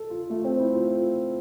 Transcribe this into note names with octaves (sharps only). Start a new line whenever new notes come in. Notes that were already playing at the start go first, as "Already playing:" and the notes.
Already playing: A4
F4
A3
C4
E4
F4